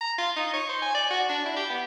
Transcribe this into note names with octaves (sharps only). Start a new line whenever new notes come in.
A#5
F4
D#4
C#5
C5
G#5
D5
F#4
D4
E4
G4
B3